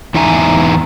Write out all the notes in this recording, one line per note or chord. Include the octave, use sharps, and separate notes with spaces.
E2 E3 D#4 E5 G#5 A#5